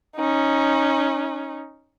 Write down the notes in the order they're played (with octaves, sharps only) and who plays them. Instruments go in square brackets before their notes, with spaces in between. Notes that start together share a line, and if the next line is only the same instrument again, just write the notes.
[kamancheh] C#4 D#4